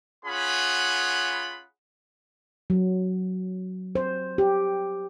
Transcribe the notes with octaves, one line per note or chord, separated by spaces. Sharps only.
C#4 F4 G#4 F#5 B5
F#3
C5
G4